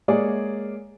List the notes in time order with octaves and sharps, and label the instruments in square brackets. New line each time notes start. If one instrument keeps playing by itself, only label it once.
[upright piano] G#3 A#3 G#4 C#5 D5